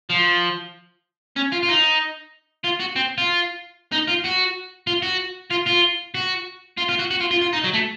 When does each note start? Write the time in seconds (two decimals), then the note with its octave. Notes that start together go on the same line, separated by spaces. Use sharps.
0.10 F3
1.36 C#4
1.52 F4
1.63 F4
1.69 D#4
2.64 F4
2.80 F#4
2.96 C4
3.18 F4
3.92 D#4
4.08 F4
4.24 F#4
4.87 F4
5.02 F#4
5.50 F4
5.66 F4
6.15 F#4
6.78 F4
6.89 F4
6.99 F#4
7.11 F#4
7.20 F4
7.31 F4
7.41 F4
7.53 D#4
7.64 F#3
7.73 A3